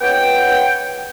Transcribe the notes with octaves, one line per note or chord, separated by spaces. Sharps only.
C#2 B3 C#5 F#5 G5